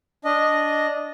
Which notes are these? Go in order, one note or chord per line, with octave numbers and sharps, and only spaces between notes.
D4 D#5